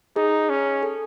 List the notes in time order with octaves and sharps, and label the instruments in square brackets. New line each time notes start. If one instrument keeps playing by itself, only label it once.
[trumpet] D#4 [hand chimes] G#4
[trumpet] C#4
[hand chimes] A4